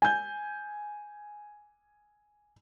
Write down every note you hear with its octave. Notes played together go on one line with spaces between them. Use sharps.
G#5 G6